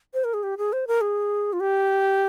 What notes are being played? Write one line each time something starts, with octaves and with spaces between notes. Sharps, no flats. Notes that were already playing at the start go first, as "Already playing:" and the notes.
C5
A#4
G#4
G4
G#4
C5
A#4
G#4
F4
G4